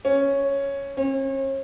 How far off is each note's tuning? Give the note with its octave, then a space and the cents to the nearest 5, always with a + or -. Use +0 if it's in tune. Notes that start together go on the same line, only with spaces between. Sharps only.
C#4 -5
C#4 -45